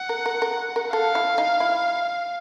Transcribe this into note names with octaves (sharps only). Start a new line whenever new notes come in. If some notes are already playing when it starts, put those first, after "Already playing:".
Already playing: F#5
A#4
A#4
A#4
A#4
A4 F5
E4
D#4
E4